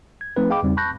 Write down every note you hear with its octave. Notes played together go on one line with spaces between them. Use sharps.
G#6
F3 A3 C4 D#4 B4
G#4 D#5 F5 G5 B5 D6
E2 C#3 G3 C4 D#4
A5 B5 C#6 F#6 G6 A#6